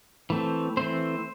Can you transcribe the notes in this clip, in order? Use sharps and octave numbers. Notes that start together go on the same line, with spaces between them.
E3 A3 C4
E3 A3 C4 C5